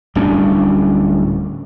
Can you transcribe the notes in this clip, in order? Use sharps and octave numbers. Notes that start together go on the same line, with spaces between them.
D1 G3 C#4 D4